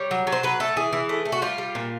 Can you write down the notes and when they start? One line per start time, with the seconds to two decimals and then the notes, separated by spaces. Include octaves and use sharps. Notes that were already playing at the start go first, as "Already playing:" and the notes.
Already playing: G3 C#5
0.11 F#3
0.27 F#3
0.32 C5
0.43 F#3 B4
0.60 A3 A4
0.76 E3 G#4
0.93 E3
1.09 A3
1.25 A3
1.32 F#4
1.42 G3 F4
1.58 G3
1.75 A#2